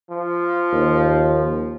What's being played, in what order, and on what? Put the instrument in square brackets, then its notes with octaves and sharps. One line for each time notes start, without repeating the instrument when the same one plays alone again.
[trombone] F3
[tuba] D#2